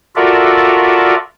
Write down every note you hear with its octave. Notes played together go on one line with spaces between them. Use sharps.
F4 F#4 A4 A#4 D5 E5